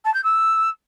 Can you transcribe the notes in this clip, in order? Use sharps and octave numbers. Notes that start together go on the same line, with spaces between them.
A5
G6
E6